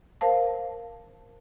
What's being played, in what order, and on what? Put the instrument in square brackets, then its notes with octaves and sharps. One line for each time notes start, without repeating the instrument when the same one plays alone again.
[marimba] A#4 C5 F5 A5